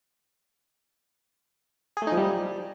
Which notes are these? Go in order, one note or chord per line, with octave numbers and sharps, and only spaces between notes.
G#4
A3
D#4
F3
G3